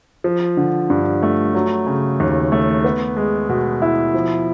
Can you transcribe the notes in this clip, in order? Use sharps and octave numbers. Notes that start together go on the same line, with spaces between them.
F3
D3
G2
A3
F#3
C#3
D#2
A3
B3
G#3
B2
E4
F3